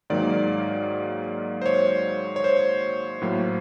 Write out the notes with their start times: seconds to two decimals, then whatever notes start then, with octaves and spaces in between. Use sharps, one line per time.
0.10 G#2 D#3 F#3 A#3 D5
1.62 C5
1.66 C#5
2.36 C#5
2.44 C5
3.22 A2 F#3 A#3